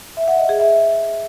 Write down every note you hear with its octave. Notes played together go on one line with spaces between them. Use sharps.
E5
F#5
D#5
G#4
E5